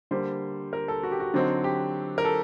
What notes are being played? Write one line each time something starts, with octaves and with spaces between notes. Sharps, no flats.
D3 G3 A#3 C5
A#4
A4
F#4
G4
F#4
D3 F#3 C4 D#4
G4
A#4
A4